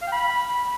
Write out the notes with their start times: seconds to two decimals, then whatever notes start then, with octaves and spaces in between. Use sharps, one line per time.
0.02 F5
0.07 G5
0.12 B5